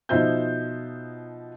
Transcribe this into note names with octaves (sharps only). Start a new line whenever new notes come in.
B2 F3 D#4 C5 E5 G6